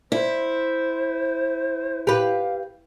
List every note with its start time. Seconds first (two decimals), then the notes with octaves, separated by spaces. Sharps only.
0.12 E4 C5
2.07 G4 B4 F5